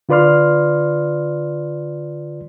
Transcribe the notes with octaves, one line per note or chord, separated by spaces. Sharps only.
D3 F4 B4 D5 C6 F6